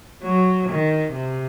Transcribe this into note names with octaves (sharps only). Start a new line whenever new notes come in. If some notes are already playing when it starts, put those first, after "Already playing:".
F#3
D#3
C3